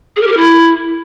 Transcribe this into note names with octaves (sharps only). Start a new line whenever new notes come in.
G#4
A#4
G4
A#4
E4